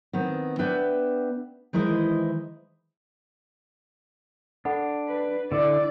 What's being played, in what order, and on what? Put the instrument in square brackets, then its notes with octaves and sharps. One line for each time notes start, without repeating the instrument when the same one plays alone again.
[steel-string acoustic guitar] D#3 B3 C4
B3 D4 B4 E5 G5
D#3 E3 G#3 E4 C5 D#5
[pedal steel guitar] D4 [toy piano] A4 F#5 B5
[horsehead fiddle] B4
[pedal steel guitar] D3 E4 [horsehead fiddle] D5